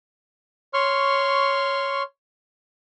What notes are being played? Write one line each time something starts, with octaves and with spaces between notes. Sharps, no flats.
C#5 C6 C#6 F6